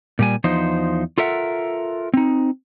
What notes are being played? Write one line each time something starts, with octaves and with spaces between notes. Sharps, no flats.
A#2 G3 G#5
E2 F3 D#4 C5
F4 A4 A#4 E5 F#5
C4 D#4